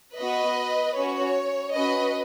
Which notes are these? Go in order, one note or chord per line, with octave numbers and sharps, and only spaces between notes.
B3 F#4 B4 D#5
C#4 F#4 C#5
C#4 F#4 B4 D#5